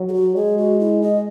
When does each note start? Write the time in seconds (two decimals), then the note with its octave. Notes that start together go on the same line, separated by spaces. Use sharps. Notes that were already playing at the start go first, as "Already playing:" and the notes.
Already playing: F#3
0.09 G#4
0.14 F#4
0.35 G#3 G#4
0.58 F#4
0.80 E4
1.02 D#5